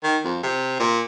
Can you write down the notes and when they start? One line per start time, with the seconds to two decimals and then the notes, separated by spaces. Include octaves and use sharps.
0.03 D#3
0.24 F2
0.43 C3
0.79 A#2